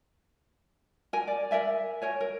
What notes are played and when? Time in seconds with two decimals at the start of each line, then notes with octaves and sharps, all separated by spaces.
1.13 A#4 G#5
1.28 D5
1.51 A#4 D5 E5 G#5
2.02 A#4 C#5 G#5
2.21 A#4